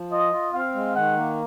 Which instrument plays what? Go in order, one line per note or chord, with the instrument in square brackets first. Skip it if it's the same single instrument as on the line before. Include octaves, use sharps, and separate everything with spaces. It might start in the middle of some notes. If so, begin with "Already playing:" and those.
Already playing: [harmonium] F3
[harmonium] F4 [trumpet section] D#5
[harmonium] F4
[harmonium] C4 [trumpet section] F5
[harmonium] G#3
[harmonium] D#3 [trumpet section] F#5
[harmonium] A#3